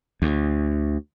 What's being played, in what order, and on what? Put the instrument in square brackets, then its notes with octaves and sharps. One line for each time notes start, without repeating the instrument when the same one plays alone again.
[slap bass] D2